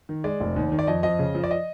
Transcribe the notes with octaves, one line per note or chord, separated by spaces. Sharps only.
D#3
G#3 D5
F1
D#2
D#3
D5
F2 D#5
F2 D#5
C#3
F3
D5
D#5